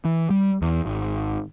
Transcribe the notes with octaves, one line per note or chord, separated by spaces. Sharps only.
E3
G3
E2
G#1